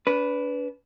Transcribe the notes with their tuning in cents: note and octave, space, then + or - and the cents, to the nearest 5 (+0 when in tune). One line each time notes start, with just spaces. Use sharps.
D4 -35 B4 +0